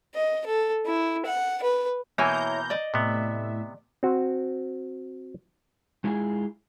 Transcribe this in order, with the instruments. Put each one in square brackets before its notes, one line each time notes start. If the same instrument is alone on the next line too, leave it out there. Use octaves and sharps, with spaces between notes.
[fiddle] D#5
A4
E4
F#5
B4
[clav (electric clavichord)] B2 E3 A#3 [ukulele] E4 C#5 G#5 [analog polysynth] A#5 G6
[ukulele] D5 D#5
[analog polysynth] A2 E5 [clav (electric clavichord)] C3 B3
[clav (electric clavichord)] C4 F#4
[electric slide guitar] G#3 E4 F4 G#4 G#5